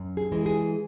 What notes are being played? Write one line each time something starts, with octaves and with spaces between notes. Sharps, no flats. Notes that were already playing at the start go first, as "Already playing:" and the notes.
Already playing: F#2
G#4
E3 G#3
G#4